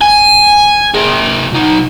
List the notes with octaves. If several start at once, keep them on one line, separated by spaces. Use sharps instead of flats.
G#5
A#3 G#4
B1 D#4